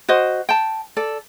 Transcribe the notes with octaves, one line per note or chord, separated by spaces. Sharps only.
F#4 C5 D#5
G5 A5
A4 D5